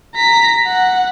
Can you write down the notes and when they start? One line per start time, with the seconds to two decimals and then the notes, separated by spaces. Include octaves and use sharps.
0.15 A#5 B6
0.66 F#5